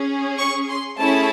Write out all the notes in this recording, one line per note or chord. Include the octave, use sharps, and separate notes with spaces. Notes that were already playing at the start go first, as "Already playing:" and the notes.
Already playing: C#4 G#4
C#6
C6
A3 C#4 E4 G#4 A5